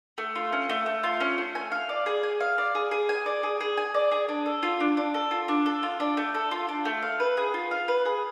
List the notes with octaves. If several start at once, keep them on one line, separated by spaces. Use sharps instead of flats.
A3
F4
C#4
A3
A3
F4
C#4
A3
G#5
F5
D5
G#4
G#5
F5
D5
G#4
G#4
G#5
D5
G#4
G#4
G#5
D5
G#4
D4
A4
F4
D4
D4
A4
F4
D4
A4
F4
D4
A3
A4
F4
D4
A3
F5
B4
G#4
F4
F5
B4
G#4